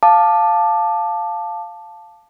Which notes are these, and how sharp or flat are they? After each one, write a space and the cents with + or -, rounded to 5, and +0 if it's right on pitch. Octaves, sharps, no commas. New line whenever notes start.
F5 +0 A5 +0 D6 +20